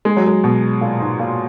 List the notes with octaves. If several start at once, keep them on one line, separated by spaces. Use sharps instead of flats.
G#3
F#3
G#3
B2
A#2
G#2
A#2